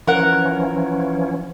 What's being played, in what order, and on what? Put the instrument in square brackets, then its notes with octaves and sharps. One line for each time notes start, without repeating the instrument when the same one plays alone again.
[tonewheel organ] E3 F3 C#4 [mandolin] A#4 F#5